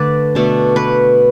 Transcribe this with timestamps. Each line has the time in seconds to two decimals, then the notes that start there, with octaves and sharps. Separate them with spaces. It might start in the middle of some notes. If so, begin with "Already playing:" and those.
Already playing: D3 A3 D4 B4 D5
0.35 B2 A3 D4
0.76 B4